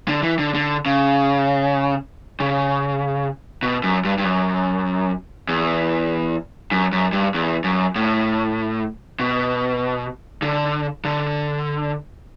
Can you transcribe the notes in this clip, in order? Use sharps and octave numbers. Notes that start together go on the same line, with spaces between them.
D3
E3
D3
D3
C#3
C#3
B2
F#2
G2
G2
F#2
E2
F#2
F#2
G2
E2
F#2
A2
B2
D3
D3